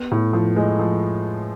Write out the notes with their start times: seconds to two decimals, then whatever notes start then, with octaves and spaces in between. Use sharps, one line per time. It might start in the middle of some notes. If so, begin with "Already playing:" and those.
Already playing: B3
0.11 A2
0.33 F3
0.56 G#3
0.79 F3